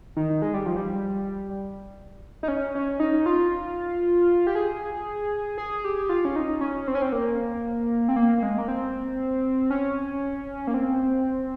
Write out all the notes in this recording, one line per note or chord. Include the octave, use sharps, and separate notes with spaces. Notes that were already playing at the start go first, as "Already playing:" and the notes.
D#3
G#3
G3
F3
G3
D#4
C#4
C#4
D#4
F4
G4
G#4
G#4
G4
F4
C#4
D#4
C#4
C4
C#4
C4
A#3
C4
A#3
A#3
G#3
A#3
C4
C#4
A#3
C4